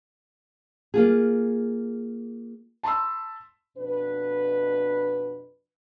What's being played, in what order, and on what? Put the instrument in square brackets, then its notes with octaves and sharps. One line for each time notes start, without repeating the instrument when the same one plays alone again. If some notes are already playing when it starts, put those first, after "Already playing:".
[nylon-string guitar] A#3 F4 G#4
[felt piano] A5 B5 C6 E6
[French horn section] F2 B2 D4 B4